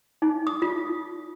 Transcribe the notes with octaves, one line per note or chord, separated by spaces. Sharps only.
D#4
D#6
F4